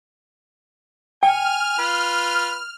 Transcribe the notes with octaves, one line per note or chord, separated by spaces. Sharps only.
G5 G#5 F6
F4 B4